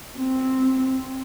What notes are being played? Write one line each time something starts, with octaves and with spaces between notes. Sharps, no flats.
C4